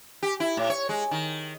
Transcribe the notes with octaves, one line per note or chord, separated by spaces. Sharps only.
G4
E4
A2
C#5
G#3
D#3